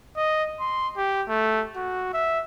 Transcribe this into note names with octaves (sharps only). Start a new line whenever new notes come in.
D#5
C6
G4
A3
F#4
E5